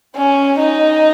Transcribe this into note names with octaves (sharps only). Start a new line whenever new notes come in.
C#4
D#4